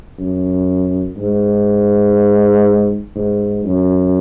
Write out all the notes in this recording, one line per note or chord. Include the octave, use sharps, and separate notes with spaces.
F#2
G#2
G#2
F#2